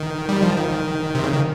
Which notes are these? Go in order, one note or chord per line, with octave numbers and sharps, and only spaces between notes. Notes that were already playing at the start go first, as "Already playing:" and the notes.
Already playing: D#3
G3
F3
D#3
C3
C#3
D#3